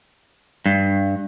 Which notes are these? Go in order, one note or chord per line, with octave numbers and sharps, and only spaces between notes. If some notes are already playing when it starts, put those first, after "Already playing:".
G2